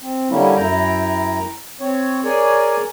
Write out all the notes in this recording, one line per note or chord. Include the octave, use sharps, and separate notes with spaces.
C4
D3 G3 A#3 C#4 E4
F#2 E4 G5 A#5
C4 C#5
G#4 A#4 C#5 D5 G#5